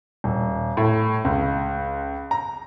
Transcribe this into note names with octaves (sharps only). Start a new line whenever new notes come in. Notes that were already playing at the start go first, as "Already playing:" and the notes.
D#1
A2
C#2
A#5